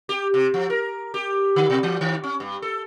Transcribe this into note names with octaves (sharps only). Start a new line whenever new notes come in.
G4
C3
F3
A#4
G4
D3
B2
E3
D#3
C#4
G2
A4